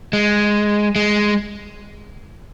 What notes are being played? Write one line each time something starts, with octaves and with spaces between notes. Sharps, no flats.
G#3
G#3